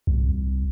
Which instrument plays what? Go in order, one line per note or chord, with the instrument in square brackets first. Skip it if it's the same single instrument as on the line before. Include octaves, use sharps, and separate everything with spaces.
[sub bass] C2